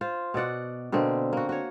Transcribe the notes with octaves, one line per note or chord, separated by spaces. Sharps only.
F4 C5
B2 F#4 D5 F#5
B2 D3 A#3 C4
A#3 F#4
F#4 C#5